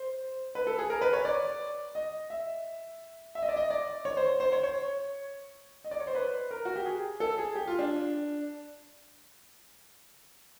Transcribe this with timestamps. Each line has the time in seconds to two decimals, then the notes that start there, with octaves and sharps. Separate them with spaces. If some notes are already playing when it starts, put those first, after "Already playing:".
Already playing: C5
0.55 B4
0.67 A4
0.78 G#4
0.90 A#4
1.01 B4
1.13 C#5
1.25 D5
1.95 D#5
2.30 E5
3.35 E5
3.42 D#5
3.49 D5
3.56 D#5
3.70 D5
4.05 C#5
4.17 C5
4.40 C5
4.52 C#5
4.63 C#5
5.84 D#5
5.91 D5
6.00 C#5
6.07 C5
6.15 B4
6.51 A#4
6.65 F#4
6.76 G4
6.85 G#4
7.20 A4
7.38 G#4
7.55 G4
7.67 F4
7.79 D4